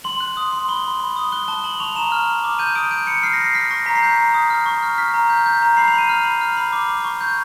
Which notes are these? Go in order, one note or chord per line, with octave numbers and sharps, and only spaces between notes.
C6 F#7
F#6
D#6
C6
B5 G7
B5
B5
D#6
F#6 G7
A5 G7
A5 F#7
C#6 F7
A#5 E7
F6
F6
D6
G6 D#7
D#6 D7
G6 D7
B5 C#7
F6 C7
A#6
F6
C7
F6 B6
C#6 A#6
A#5 B6
C7
G6 B6
A#5
D#6
F6
C#6
F6
F6 B6
A#5
G6
G6
A#5
B5 C7
F7
B5 D#7
F6
B5
F6
B5
D6
D6
C#6
G6